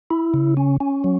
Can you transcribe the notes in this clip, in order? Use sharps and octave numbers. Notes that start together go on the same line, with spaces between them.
E4
C#3
C#4
C#4
F#3